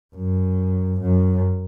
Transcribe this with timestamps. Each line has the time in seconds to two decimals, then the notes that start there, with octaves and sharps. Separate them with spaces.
0.15 F#2
1.00 F#2